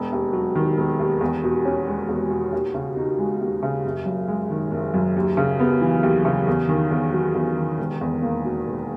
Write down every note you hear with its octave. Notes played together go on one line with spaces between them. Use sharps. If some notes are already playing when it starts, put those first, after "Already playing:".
Already playing: E1
D#2
F#3
D#3
E1
D#2
E2
B2
C#4
G#3
E2
B2
D#2
C#3
D#4
G#3
D#2
C#3
F#1
F#2
G#3
D#3
F#1
F#2
D#2
C#3
B3
E3
D#2
C#3
E2
D#3
E2
F#3
E2
D#3
E1
E2
A#3
B2
E1